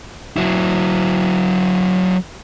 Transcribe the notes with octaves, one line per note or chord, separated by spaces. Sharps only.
F#3 E4